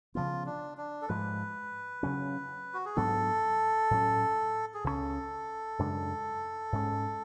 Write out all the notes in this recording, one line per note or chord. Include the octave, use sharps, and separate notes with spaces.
C#3 F3 B3 F4
D4
D4
A4
G#2 F3 G#3 B4
C#3 F#3 C#4
F#4
G#4
G#2 F#3 B3 D4 A4
A2 F#3 C#4
G#4
C#2 C#3 F#3 C#4 A4
F#2 C#3 G#3 D4
G#2 G#3 C#4